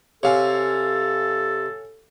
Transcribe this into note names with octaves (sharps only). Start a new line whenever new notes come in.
C3 A4 C#5 F5 G#5